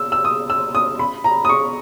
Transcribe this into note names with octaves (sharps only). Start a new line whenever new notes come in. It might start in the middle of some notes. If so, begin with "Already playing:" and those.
Already playing: E6
E6
D#6
E6
D#6
B5
A#5
D#6
C#6